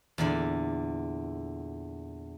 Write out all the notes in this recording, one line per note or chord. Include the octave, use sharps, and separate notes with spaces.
E2 A#2 D3